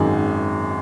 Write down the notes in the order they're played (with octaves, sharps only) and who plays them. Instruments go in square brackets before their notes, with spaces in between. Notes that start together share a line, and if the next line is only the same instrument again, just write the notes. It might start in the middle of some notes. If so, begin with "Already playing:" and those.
Already playing: [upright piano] G#1 F#2 D#3 G#3